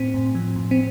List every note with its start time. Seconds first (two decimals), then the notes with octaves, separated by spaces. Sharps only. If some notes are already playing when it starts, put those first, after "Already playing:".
Already playing: A2 C4
0.14 A2
0.35 F3
0.56 A2
0.71 C4